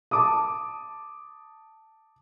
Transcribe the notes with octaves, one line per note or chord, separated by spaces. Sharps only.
A5 D6 D#6